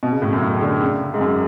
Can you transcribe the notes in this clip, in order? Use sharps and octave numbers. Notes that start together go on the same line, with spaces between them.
B2
C#3
A2
F#2
A2
D3
C#3
G#2
F#2